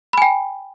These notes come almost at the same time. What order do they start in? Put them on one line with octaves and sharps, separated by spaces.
B5 G#5 G5